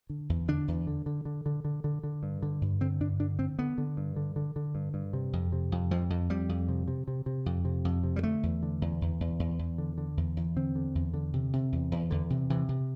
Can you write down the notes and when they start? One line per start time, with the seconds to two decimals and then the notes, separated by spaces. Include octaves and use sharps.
0.10 D3
0.29 E2
0.48 D3 D4
0.68 E2
0.87 D3
1.06 D3
1.25 D3
1.46 D3
1.65 D3
1.84 D3
2.03 D3
2.23 G2
2.42 D3
2.61 G2
2.81 D3 C4
3.00 G2 D4
3.20 D3 D4
3.39 D3 C4
3.59 D3 B3
3.78 D3
3.97 G2
4.16 D3
4.36 D3
4.56 D3
4.75 G2
4.94 G2
5.13 C3
5.33 F2
5.52 C3
5.72 F2
5.91 F2 F3
6.10 F2
6.30 F2 G3
6.49 F2
6.68 C3
6.88 C3
7.08 C3
7.26 C3
7.46 F2
7.65 C3
7.85 F2
8.04 C3
8.16 G3
8.23 D3 A3
8.43 E2
8.63 D3
8.81 E2
9.01 E2
9.20 E2
9.39 E2
9.59 E2
9.78 D3
9.98 D3
10.17 E2
10.37 E2
10.56 D3 C4
10.75 D3
10.95 E2
11.14 D3
11.33 C3
11.53 C3
11.72 E2
11.92 E2
12.10 E2 D3
12.30 C3
12.50 C3 E3
12.69 C3